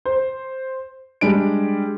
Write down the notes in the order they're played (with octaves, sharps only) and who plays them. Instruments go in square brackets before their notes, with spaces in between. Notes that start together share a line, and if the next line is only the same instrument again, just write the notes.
[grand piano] C5
G3 G#3 D4 D7